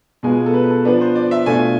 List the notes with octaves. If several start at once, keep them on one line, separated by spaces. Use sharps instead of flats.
B2 G#3 B3 F4 G#5
A4
B4
B4
A4
F3 B3 D4 B4
C5
D5
E5
B2 A3 D4 F4 G#5